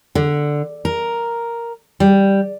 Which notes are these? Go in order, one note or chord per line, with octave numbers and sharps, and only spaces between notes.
D3
A#4
G3